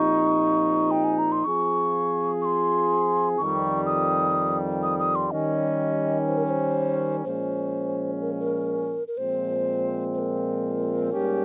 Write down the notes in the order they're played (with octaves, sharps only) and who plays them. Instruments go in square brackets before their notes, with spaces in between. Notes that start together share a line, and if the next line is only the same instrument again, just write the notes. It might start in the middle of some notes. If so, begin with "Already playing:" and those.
Already playing: [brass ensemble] A#2 F3 C4 D#4 G4 [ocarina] C#6
[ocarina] G5
G#5
A#5
C6
[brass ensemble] F3 C4 F4 G#4 [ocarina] C#6
[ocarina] C#6
C6
[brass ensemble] F2 D#3 G3 [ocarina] C#6
[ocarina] D#6
D#6
D#6
C6
[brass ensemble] D#3 G3 C#4 [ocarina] D#5
[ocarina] C5
A#4
C#5
C5
[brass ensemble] A#2 F3 G#3 C#4 [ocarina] C5
[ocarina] A#4
A#4
A#4
[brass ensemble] A#2 F3 G#3 C4 [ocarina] C5
[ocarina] C5
A#4
[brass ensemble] G#2 G3 A#3 C#4 G4